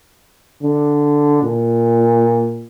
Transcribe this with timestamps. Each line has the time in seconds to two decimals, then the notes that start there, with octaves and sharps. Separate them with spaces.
0.63 D3
1.43 A#2